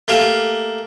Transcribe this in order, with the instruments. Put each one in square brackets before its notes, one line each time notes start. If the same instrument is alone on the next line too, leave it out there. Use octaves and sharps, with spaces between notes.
[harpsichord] A3 A#3 G4